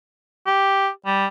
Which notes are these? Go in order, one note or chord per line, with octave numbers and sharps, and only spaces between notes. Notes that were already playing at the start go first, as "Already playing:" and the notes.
G4
G3